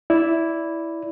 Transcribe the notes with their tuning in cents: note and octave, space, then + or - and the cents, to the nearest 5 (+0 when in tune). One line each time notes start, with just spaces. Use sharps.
E4 +0 D5 -15